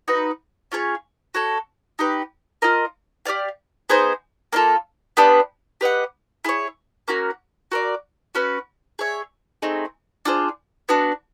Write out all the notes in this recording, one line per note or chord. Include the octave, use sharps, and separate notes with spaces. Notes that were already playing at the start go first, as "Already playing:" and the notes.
D#4 F#4 B4
C#4 F4 G#4 C#5
F#4 A4 C#5
D#4 G4 B4
F4 A#4 D#5
G4 A#4 D5 F5
B3 D#4 G#4 C5
A#3 D4 F4 A4
B3 D4 G4 B4
G4 B4 D#5 F#5
E4 G#4 C#5
A#3 C#4 F#4 A#4
F#4 A#4 D5
C#4 F#4 B4
G#4 C#5 E5
A3 C4 D#4 G#4
D4 F4 G#4 C5
B3 D4 F#4